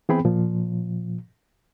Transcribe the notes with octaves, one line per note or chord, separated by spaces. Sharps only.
E3 B3 C4 G#4 G5 B5
A#2 F3